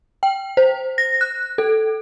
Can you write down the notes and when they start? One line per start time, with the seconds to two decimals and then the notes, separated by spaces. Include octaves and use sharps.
0.23 G5
0.57 C5
0.98 A#6
1.21 F#6
1.58 A4